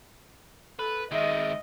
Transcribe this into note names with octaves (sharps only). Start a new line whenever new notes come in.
A4 B4
D#3 G#3 D#5 E5